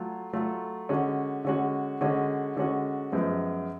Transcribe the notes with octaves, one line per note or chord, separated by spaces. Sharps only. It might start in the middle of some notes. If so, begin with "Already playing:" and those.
Already playing: F#3 A3 F4 A4
F#3 A3 F4 A4
D3 G#3 C#4 F#4
D3 G#3 C#4 F#4
D3 G#3 C#4 F#4
D3 G#3 C#4 F#4
F#2 F3 G#3 B3